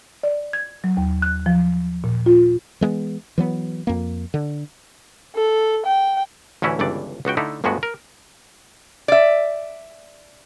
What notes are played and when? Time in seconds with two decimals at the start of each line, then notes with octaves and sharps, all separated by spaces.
0.23 D5
0.53 G#6
0.84 F#3
0.97 D#2
1.22 F#6
1.46 F3
2.04 A#2
2.26 F4
2.81 E3 G#3 A#3 B3
3.38 E3 F#3 B3
3.87 F2 A#3
4.34 D3
5.35 A4
5.86 G5
6.62 A1 D2 E3 C#4 E4
6.79 G1 C#2 G2 E3 D5
7.25 C#2 B3 F#4 G5
7.37 D3 A3 D#4 E4
7.64 G1 D2 G2 G#3 B3 F#4
7.83 A#4
9.08 D5 E5